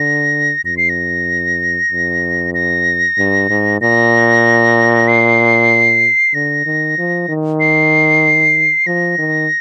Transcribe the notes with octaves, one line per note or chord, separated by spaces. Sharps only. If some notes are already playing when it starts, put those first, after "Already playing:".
Already playing: D3 A#6
F2 A#6
C7
A#6
F2
A#6
G2
G#2
A#2 A#6
C7
D3 A#6
D#3
F3
D#3
C7
F3 A#6
D#3